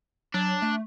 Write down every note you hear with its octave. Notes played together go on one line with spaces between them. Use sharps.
F#3 D4
A3